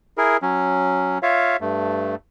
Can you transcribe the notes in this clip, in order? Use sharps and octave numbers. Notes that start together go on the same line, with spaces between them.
E4 G#4 A#4
F#3 C#4
F4 C#5 E5 F5
G2 A3